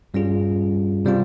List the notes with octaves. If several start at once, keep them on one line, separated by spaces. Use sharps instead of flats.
G2 G3 C#4 F4 G#4
C3 G3 C4 F4